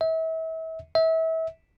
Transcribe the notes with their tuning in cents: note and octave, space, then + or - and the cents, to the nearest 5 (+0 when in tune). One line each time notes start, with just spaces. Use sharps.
E5 -35
E5 -30